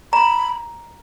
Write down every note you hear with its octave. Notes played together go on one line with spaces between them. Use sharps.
A#5 B5